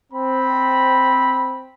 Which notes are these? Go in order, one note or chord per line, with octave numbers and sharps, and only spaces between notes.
C4 B5